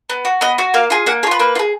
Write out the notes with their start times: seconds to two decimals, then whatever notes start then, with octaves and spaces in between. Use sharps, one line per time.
0.10 B3
0.25 F#4
0.41 B3 D#5
0.58 F#4
0.74 A#3 F5
0.90 F4 G#4
1.06 A#3 F#5
1.23 G#4 C#5
1.27 F4 B4
1.39 A#3 B4
1.55 F4
1.59 G#4